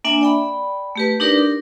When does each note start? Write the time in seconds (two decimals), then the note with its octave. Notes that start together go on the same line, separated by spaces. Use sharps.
0.04 A#3 D4 E5 G#5
0.21 D5 G5 B5
0.96 A3 G4 B4
1.20 D4 D#4 G4 A#4 B4 D5
1.38 A#4